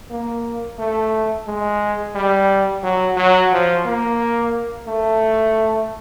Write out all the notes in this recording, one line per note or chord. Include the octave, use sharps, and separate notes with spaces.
A#3
A3
G#3
G3
F#3
F#3
F3
A#3
A3